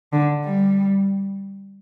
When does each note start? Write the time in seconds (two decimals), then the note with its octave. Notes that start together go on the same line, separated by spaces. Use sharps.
0.13 D3
0.45 G3